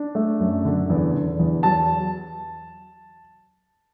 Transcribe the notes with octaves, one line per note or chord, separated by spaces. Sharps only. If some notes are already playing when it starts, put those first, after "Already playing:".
Already playing: D4
A3
F#2
D3
E2
D3
E2
F#3 A5